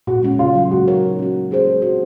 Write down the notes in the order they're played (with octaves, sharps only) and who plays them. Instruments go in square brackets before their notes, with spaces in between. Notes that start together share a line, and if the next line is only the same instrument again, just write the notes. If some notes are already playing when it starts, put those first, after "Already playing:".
[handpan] A#2 [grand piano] F#4
[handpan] G#3 C#4
[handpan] C#3 [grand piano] F4
[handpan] F#3 A#3 C#4
[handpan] G#3 [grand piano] F#4
[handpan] D#4 A#4 C#5
G#3
C#4 F#4
A#3
C#4 G#4 C5
G#3
C4 F#4